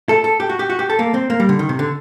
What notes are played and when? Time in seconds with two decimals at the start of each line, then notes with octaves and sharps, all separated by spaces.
0.09 A4
0.24 A4
0.40 G4
0.49 F#4
0.59 G4
0.70 F#4
0.79 G4
0.90 A4
0.99 A#3
1.14 C4
1.30 A#3
1.40 G3
1.49 D3
1.59 D#3
1.69 C3
1.79 D3